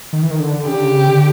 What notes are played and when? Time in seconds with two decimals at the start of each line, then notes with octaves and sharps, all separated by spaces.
0.13 D#3
0.23 E3
0.31 D#3
0.40 D3
0.66 C#3 G4
0.75 D3
0.85 C#3
1.08 D3